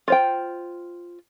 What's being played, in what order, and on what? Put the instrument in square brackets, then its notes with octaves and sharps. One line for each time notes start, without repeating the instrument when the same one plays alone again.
[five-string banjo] F4 C5 G5